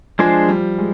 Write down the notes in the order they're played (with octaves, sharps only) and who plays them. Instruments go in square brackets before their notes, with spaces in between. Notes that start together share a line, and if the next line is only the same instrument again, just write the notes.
[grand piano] F3 [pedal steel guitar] G#3 D4 G#4 C5
[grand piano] G3
G#3